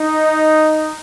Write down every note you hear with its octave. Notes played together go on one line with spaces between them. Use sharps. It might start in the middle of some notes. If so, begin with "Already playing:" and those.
Already playing: D#4